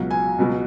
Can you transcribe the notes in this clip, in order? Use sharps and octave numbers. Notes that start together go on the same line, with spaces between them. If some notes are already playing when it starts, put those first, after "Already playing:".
Already playing: C#2 B2 F#3
G#5
C#2 B2 F#3